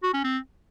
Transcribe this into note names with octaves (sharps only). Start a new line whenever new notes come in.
F#4
C#4
C4